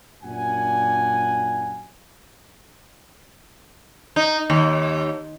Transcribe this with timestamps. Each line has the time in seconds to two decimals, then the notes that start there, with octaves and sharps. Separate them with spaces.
0.24 F#2 A#2 D4 F#5 G#5
4.16 D#4
4.50 D#2